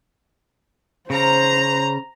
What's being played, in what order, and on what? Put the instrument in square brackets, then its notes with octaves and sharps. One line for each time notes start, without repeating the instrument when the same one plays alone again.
[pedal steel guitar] C#3 [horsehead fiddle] C5 [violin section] A#5